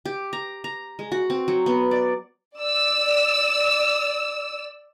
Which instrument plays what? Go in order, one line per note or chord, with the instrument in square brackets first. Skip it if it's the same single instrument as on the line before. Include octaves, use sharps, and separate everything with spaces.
[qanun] G4
A#5
A#5
G#3
F#4
C4
F#3
B3
D5
[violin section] D5 E6